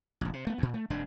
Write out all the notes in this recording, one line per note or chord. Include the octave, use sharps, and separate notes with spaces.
F1 A#1
C3
A3 B3
D2 A#2
A3
F1 G2 C3 D4